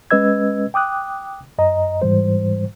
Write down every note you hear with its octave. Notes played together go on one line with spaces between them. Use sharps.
G#3 C#4 B4 D#5 E6 G#6
G5 D6 D#6 F#6
F#2 D#5 A#5
G#2 E3 G3 C5